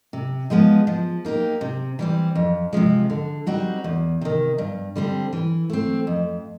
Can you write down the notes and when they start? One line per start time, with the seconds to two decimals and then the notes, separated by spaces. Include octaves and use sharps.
0.13 C3
0.50 F3 G#3 B3 D#4
0.87 F3
1.25 A#3 D#4 G4
1.61 C3
1.99 E3 G3 C4
2.35 F2
2.73 C3 F3 G#3
3.10 D3
3.47 G3 C4 D#4 F#4
3.84 E2
4.21 C3 D#3
4.58 G2
4.96 D3 G3 C4
5.33 E3
5.70 A3 C4
6.07 F2